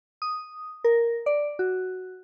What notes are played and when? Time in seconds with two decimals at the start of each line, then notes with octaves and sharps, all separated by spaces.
0.22 D#6
0.84 A#4
1.26 D5
1.59 F#4